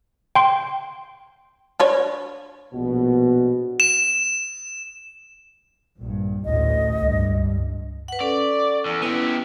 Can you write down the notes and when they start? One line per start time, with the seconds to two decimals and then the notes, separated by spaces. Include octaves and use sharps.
0.35 G5 C6
1.80 D4 B4 C#5
2.73 A#1 B2
3.80 E7
5.99 A#1 G2
6.45 A1 D2 A2 D#5
7.02 C#2 G2
8.08 B4 F#5
8.21 C#4 A4 D5
8.86 E2
9.02 B3 E4 G4